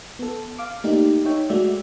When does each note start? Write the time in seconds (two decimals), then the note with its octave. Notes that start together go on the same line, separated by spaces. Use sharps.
0.19 B3 A4
0.58 F5 D6
0.84 A3 A#3 D#4 G4 D5
1.25 D#4 C#5 E5 G5
1.50 G#3 A3 F#4 D5 E5